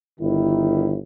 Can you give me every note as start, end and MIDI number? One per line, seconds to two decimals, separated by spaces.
0.20 0.97 31
0.20 0.97 51
0.20 0.97 64